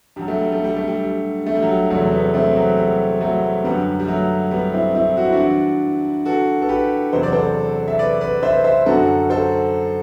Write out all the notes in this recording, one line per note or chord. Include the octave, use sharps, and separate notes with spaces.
G2 F#3 G3
A3
G3
A3
G3
A3
G3
G3
A3
G3
F#3
G3
E2 C3 F#3 A3
G3 B3
A3 C4
F#3
G3
F#3 A3
F#2 D3 F#3 G3 B3
G3
F#3 A3
G3 B3
C4 E4
C4 E4
F#4
E4
D4 F#4
G2 E3
F#4 A4
A4
G4 B4
E2 C3 F#3 C5
D5
A4 C5
E5
B4 D5
B4 D5
C5 E5
C5 E5
F#2 D3 F#3 F#4 A4
A4 C5